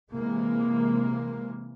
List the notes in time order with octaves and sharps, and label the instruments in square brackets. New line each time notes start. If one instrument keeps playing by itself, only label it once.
[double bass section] C3 E3 G#3 A#3